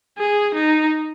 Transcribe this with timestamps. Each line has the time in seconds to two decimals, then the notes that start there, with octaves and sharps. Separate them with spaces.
0.18 G#4
0.54 D#4